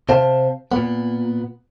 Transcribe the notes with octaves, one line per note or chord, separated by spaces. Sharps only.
C3 C5 F5 A5
A#2 B3